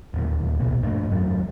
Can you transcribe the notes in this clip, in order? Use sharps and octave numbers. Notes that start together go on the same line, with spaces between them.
D1 D#2
A#1 B2 A#3
G2 A3 A#3 D4
G#1 F2 F#3